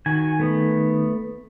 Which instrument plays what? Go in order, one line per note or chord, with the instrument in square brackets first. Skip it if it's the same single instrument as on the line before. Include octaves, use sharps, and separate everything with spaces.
[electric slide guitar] D#3 [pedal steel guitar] F#4 G#5
[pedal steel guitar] A3 B3